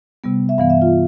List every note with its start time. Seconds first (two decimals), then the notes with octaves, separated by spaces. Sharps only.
0.24 C3 G3 B3
0.49 E5
0.58 G2 E3 B3 F5
0.70 E5
0.82 F4